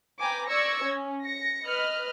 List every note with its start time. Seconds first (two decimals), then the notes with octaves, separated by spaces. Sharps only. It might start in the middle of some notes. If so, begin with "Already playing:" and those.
0.19 B4 G5 G#5 A#5 D6
0.49 D5 C#6 E6 G#6 A#6 C#7
0.83 C#4
1.22 A#6 C#7
1.66 B4 D#5 F6 F#6